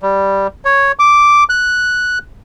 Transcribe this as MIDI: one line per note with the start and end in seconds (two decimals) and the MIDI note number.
0.02 0.47 55
0.65 0.92 73
0.99 1.44 86
1.49 2.18 90